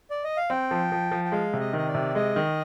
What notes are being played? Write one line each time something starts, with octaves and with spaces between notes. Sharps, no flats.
D5
D#5
F5
C4 G5
F3
F3
F3
G5
G#3 F5
C3
D#5
D#3 D#5
D5
C3
G#3 D#5
D#3